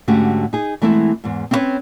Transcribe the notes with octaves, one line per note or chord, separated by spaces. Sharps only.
G#2 D3 A3 C#4 F#4 G4
D#4 G#4
E3 G#3 A3 B3 C4 E4
E2 G#2
C4 C#4 E4 A4 B4 C#5